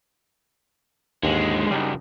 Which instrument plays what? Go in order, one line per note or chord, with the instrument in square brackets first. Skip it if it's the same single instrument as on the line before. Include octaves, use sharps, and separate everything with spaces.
[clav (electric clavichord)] D#2 G#2 [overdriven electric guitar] D3 G#3
[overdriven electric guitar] F#2 C#3 [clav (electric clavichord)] G3 D4 D#4